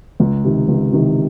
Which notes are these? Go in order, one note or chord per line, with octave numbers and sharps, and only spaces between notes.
C#2
C3 D#3
C#2
C3 D#3